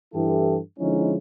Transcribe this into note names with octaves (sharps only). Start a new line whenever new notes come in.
G2 E3 E4 G4 A4
D3 F3 G#3 C#4 D#4 E4